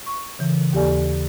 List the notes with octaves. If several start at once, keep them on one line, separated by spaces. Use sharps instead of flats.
C#6
C#3 E3
D#2 A#3 G4 A4 D5 G#5